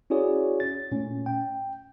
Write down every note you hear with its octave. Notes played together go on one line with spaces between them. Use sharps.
C#4 E4 F#4 G#4 C#5 D5
A6
A#2 A3 C#4
G5